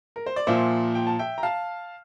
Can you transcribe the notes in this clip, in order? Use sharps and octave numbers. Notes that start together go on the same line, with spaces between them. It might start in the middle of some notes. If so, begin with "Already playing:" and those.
A#4
C5
D5
A#2 F3 A#3 C5 E5
G5
A5
E5 G5
A#5
F5 A5